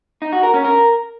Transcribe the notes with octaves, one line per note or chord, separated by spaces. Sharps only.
D#4
F#4
A#4
C#4
A#4